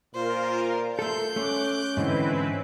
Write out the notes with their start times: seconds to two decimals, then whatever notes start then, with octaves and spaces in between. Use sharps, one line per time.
0.15 A#2 F4 A#4 C5
0.99 A3 A4 C6 G6
1.36 A3 C#4 D6 F#6
1.97 G#2 D3 E3 C4 E4 B4